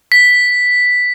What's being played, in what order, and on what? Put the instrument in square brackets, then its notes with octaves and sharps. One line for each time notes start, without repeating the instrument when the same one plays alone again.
[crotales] B6